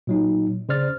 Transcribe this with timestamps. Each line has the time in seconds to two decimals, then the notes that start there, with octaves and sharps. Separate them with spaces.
0.07 A#2 F#3 D#4
0.69 C#3 C5 D5 F6 A6